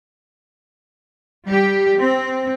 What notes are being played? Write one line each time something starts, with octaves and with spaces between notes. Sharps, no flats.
G3 G4
C4